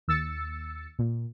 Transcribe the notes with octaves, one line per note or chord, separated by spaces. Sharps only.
D#2 E6 A6 C#7
A#2